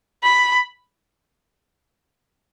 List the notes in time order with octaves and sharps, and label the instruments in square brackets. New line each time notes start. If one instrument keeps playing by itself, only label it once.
[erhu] B5